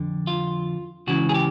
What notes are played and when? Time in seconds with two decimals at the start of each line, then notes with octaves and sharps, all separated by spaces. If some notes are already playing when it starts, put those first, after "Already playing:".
Already playing: F2 D3
0.27 F4
1.07 C#2 C#3 E3 F#4
1.29 G#4
1.34 G4